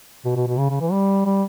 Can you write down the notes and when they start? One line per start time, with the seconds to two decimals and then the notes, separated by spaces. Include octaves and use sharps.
0.25 B2
0.36 B2
0.47 B2
0.58 C#3
0.69 C#3
0.80 E3
0.91 G3
1.26 G3